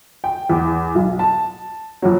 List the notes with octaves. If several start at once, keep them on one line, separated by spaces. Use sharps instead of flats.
G5
E2
B1
A5
F2 F#3